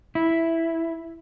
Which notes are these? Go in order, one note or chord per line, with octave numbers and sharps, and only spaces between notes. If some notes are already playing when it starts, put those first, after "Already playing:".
E4